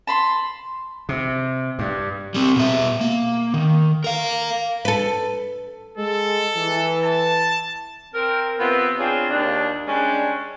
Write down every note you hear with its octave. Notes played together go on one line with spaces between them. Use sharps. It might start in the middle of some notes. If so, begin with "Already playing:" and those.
A5 B5 C6
C3
G2
G3 C4
B2 E5
A#3
D#3
A#4 F5
A4 B4
G#3 A4
E3
A5
C4 A#4
C3 B3 C4 F4 B4
C4 D4 F4 G#4 C#5
D#2 D4
G3 G#3 C#4 D4